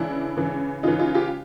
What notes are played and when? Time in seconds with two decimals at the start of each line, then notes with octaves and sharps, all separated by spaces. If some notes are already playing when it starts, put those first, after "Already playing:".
Already playing: C#3 E3 D4 E4
0.37 C#3 E3
0.83 C#3 E3 D#4 F4
0.99 D#4 F4
1.14 F4 G4